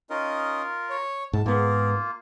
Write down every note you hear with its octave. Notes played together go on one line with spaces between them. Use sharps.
C#4 D#4 F4 A#4 D#5
C#5
G#2 A5
G#2 A#3 B3 F4 G#4 A#4